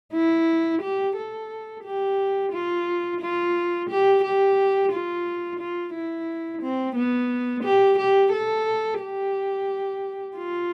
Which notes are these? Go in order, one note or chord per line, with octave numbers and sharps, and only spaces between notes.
E4
G4
A4
G4
F4
F4
G4
G4
F4
F4
E4
C4
B3
G4
G4
A4
G4
F4